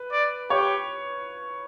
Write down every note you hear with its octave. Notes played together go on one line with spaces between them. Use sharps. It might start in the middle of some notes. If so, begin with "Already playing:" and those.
Already playing: B4
D5
G4 C#5